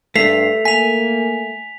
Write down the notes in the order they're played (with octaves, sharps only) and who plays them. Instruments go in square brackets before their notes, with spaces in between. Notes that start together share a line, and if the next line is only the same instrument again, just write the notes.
[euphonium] G2 [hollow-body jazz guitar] A3 [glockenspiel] B6 [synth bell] C7 F7
[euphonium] A#3 [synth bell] G#5 [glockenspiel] B6 F7